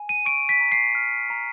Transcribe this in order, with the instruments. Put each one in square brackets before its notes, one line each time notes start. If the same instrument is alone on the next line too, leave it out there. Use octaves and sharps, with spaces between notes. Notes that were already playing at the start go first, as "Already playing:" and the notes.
Already playing: [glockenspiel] G#5
D#7
C#6 D7
B6
A#5
C7
F6
A#5